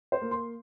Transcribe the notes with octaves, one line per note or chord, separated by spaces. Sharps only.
C5
A#3
C6